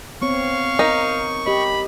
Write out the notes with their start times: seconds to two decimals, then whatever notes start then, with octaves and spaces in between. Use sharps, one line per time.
0.22 B3 C4 C#5 F5 C#6
0.79 D#4 A#4
1.47 G4 D#5 B5